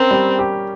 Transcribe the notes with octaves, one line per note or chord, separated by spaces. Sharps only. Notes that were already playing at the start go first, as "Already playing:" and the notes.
Already playing: C4 C#4 A#4
G3
G4